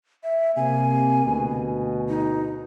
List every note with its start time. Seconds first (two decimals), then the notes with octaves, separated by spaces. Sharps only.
0.24 E5
0.56 C3 A#3 G#5
1.23 D2 B2
2.09 D#4